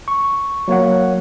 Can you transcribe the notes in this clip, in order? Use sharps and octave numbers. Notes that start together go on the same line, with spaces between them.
C#6
F#3 A#3 C#5 F#5